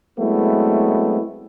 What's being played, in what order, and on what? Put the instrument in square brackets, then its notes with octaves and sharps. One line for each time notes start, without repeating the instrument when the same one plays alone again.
[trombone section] F#3 G#3 A3 B3 C4 E4